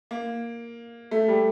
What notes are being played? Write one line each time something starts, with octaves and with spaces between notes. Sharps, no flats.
A#3
A3
G3